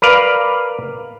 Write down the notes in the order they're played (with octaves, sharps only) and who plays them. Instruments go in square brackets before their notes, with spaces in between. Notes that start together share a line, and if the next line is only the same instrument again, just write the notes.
[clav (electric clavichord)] A#4 B4 D5 F5